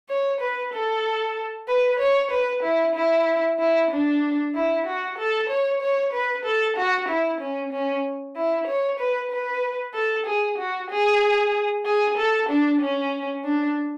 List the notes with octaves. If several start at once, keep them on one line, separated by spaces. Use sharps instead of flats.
C#5
B4
A4
B4
C#5
B4
E4
E4
E4
D4
E4
F#4
A4
C#5
C#5
B4
A4
F#4
E4
C#4
C#4
E4
C#5
B4
B4
A4
G#4
F#4
G#4
G#4
A4
D4
C#4
D4